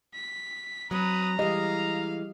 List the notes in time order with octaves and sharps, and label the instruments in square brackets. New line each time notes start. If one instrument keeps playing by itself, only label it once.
[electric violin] B6
[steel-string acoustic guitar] F#3 C4 [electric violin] B4 D#6 [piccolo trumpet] A#5
[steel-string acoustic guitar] E3 G#3 [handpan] G3 G4 D#5 [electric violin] F5